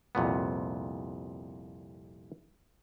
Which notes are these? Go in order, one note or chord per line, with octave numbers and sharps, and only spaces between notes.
C2 F2 A#2 B3